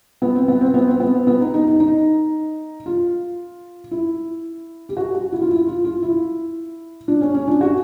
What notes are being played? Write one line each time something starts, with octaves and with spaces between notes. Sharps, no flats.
B3
C4
B3
C4
B3
C4
B3
B3
D#4
D#4
D#4
D#4
F4
E4
G4
F#4
F#4
E4
F4
E4
F4
F4
E4
D4
C#4
C#4
D4
F#4